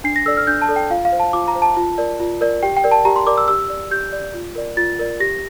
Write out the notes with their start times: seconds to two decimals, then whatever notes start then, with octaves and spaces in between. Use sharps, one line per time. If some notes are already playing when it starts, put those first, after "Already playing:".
0.04 D4 C7
0.16 A#6
0.26 A4 D5 E6
0.37 F6
0.47 D4 G6
0.62 A5
0.69 A4 D5
0.76 G5
0.90 F4 F5
1.05 F5
1.12 C5
1.20 A5
1.33 F4 D6
1.48 A#5
1.55 C5
1.62 A5
1.77 F4
1.98 A#4 D5
2.20 F4
2.41 A#4 D5
2.63 G4 G5
2.77 G5
2.84 A#4 D5
2.91 A5
3.05 G4 A#5
3.16 C6
3.27 A#4 D5 D6
3.37 E6
3.48 G4 E6
3.70 D5
3.91 G4 G6
4.13 D5
4.34 F4
4.56 A#4 D5
4.77 F4 A6
4.99 A#4 D5
5.20 G4 A#6